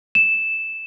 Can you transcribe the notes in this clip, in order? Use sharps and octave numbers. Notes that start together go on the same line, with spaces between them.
E7